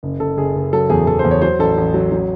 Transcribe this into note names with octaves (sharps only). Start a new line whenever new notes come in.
F#1
F#1 A4
F#1 G#4
F#1
F#3 A4
E2 G#4
E2 A4
C5
E2
C#5
F#3 C5
A1 A4
A1
F#3
F#3